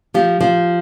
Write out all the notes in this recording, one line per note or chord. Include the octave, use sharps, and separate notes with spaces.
F3 G4
F3